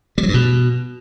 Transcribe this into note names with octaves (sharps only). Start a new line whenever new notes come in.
G3
F#3
G2
B2